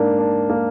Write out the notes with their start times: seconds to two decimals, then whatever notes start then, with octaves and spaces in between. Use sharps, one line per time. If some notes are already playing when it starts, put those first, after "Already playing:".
Already playing: G#2 A#3 D4
0.19 D4
0.50 A#3